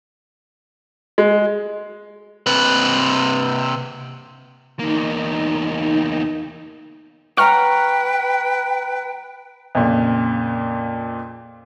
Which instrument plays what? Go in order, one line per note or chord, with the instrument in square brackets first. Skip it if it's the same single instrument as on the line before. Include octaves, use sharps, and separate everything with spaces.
[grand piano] G#3
[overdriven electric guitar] C3 B4
[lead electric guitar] E2 A#3 [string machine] D#4
[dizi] B4 [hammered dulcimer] F#5 A#5 [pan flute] G5 [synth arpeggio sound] C#6 F6
[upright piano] F2 A#2 C#3